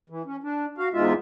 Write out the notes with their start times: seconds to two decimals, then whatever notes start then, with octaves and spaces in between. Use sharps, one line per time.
0.10 E3
0.26 C#4
0.43 D4
0.78 F#4 F5
0.93 E2 G#2 G#3 F4 E5